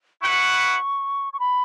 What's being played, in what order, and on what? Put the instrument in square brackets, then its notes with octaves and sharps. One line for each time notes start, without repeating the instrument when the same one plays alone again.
[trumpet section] E4 B4 F#5 [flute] C#6
[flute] C#6
B5